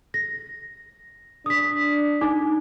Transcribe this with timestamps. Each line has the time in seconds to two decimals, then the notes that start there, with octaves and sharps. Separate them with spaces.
0.14 A#6
1.46 D4 D#6 B6
2.21 D#4 D6